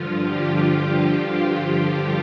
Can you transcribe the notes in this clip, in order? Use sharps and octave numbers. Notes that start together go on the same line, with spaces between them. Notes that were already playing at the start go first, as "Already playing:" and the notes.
Already playing: G2 D3 F3 F4
G4